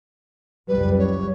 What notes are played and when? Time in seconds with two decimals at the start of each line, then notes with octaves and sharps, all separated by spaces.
0.68 F#1 C#2 G3 B4
0.98 C#5